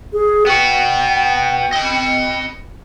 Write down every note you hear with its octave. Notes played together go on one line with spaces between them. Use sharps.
G#4
B3 F#4 G5
D#5 B5